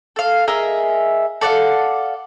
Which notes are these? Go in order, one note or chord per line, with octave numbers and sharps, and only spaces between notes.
A4 F5
G#4 A#4 D#5 E5
A4 D5 F5 F#5